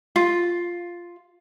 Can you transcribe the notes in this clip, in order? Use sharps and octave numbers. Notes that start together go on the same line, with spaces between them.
F4